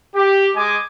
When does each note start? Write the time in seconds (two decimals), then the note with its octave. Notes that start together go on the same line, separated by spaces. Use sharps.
0.15 G4
0.56 G#3 D#5 G#5 D6